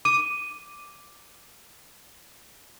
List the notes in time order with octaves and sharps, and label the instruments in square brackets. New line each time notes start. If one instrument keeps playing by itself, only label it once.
[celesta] D6 D#7